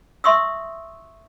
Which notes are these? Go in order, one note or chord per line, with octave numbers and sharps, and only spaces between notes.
E5 C6 C#6 D#6 E6